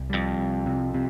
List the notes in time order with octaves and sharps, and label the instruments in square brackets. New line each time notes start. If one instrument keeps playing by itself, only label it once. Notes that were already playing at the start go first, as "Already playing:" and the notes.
Already playing: [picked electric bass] C2
[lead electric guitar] F2 [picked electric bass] G3
[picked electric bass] C2
C3
C3